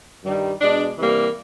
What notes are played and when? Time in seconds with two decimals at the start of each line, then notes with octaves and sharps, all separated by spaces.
0.22 G2 D#3 G3
0.60 B2 G#3 D4
0.97 C3 E3 G3 A#3